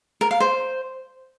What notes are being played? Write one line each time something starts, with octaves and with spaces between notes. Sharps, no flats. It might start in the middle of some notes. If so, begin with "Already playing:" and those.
A#4
F5
C5